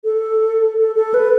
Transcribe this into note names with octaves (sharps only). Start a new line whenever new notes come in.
A4
A4
A4
B4